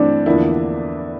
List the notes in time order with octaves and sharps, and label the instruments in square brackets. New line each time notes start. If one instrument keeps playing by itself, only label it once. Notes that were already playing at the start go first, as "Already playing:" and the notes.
Already playing: [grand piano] G2 E3 A3 C4 [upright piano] D4
[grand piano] E2 D3 F3 A#3 E4